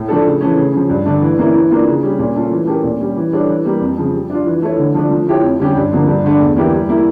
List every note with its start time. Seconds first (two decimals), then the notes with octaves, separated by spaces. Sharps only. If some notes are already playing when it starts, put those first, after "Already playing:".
Already playing: A2
0.09 F3 A3 D4 A4
0.25 C#3
0.41 E3 A3 C#4
0.57 C#3
0.73 F3 C#4
0.90 G2
1.06 D3 A3 D4
1.22 E3
1.39 A#3 C#4 E4
1.54 E3
1.70 A#3 D4 F4
1.87 C#3
2.03 G3 C#4
2.19 A#2
2.35 A3 C#4 F4
2.51 E3
2.67 A3 C#4 G4 A#4
2.84 A#2
3.00 G3 C#4
3.16 E3
3.32 G3 D4 A4 C#5
3.48 E3
3.65 G3 A#3
3.81 F2
3.97 C#3 F3
4.13 G3
4.30 D4 F4
4.46 E3
4.62 A3 E4 A4 C#5
4.78 D3
4.94 F3 A3 D4
5.11 F3
5.27 A3 E4 G4 C#5
5.43 F2
5.59 D3 G3 C#4 G4
5.76 G2
5.92 D3 F3 A#3
6.08 G2
6.24 D3 A3 D4
6.40 E2
6.56 E3 A#3 E4 G4
6.72 G3
6.89 A#3 E4